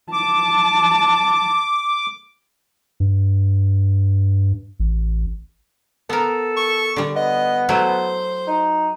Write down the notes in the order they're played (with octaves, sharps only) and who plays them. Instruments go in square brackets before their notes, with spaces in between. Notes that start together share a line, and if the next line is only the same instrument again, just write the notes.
[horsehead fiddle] A5 [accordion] D6
[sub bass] G2
A1
[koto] B3 A#4 [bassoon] A4
[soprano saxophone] C#6
[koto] D3 G3
[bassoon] B3 [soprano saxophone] D#5
[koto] F#3 A3 E4 [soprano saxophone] C5
[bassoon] D#4